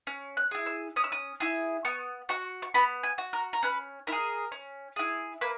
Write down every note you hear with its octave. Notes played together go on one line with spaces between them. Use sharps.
C#4
F#6
E4 G#4
E6
C#4 D#6
E6
D#6
E4 G#4
B3 C#6
F#4 C#6
C#6
B3 B5
G#5
F#4
A#4
A#4
C#4 B4
E4 A#4
G#4
C#4
E4 G#4
A#3 B4